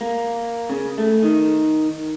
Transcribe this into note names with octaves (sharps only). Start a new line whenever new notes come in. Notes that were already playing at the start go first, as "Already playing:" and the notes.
A#3
C#3
A3
D#3